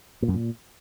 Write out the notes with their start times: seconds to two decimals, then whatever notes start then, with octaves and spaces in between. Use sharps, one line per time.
0.22 A#2
0.28 F#2
0.34 A#2